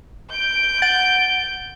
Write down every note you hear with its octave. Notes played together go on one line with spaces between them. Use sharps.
G6 D7
F#5 A6